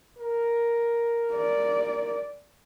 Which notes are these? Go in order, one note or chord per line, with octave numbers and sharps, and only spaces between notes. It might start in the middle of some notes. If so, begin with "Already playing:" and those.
A#4
D5